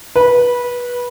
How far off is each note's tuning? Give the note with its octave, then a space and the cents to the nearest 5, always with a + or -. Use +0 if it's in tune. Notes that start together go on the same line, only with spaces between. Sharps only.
B4 -20